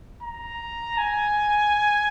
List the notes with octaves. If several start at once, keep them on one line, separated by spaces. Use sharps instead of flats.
A#5
G#5